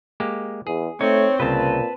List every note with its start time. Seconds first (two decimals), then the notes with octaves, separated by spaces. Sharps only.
0.20 G#3 A#3 G4
0.67 E2 G#4
1.01 A3 C4 D#4 C#5
1.40 C2 A#2 C#3 B4 A5